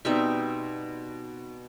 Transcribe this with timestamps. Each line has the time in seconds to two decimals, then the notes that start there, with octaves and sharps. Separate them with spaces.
0.05 B2 G3 C4 D#4 E5